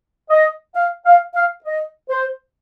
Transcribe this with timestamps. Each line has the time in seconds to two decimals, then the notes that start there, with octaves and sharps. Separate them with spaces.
0.30 D#5
0.75 F5
1.05 F5
1.34 F5
1.65 D#5
2.10 C5